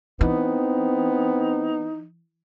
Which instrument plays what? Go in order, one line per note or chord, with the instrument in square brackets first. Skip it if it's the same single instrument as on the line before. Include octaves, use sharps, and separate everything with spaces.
[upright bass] E3 [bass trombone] B3 [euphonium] C4 [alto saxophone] D#4